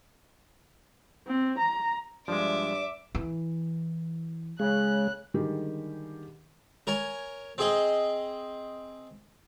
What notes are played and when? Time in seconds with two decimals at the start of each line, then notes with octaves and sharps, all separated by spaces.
1.27 C4
1.59 A#5
2.28 G2 F3 G#3 D5 E5 D6
3.15 E3
4.60 C#3 G#3 F#6
5.34 D3 D#3 G3 G#3 G4
6.87 A#4 C#5 G#5
7.58 C4 G#4 D#5